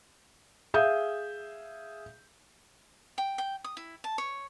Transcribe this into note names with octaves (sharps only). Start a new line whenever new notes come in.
G#4 E5 F5 D#6 G6
G5
G5
D#6
E4
A5
C#5